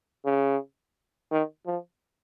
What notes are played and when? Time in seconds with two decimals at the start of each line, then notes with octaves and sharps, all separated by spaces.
0.25 C#3
1.31 D#3
1.66 F3